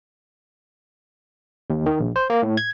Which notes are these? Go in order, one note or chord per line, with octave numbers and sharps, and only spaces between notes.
D#2
D#3
A#1
C5
A#3
A2
G#6